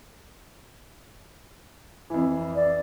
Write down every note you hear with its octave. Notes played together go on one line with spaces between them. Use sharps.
F2 E3
D5